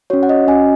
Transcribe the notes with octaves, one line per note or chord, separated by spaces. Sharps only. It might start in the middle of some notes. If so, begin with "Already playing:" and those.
C#4 F#4 C#5
F#5
D#5
C#4 F#4 D#5 G#5